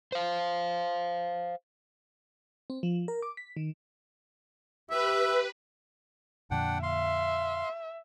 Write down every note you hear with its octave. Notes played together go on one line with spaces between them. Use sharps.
C5 F5
C4
F3
A#4
D6
B6
D#3
G4 B4 E5
F2 A#2 D3 D4 F#5 G5
E5 F5 C6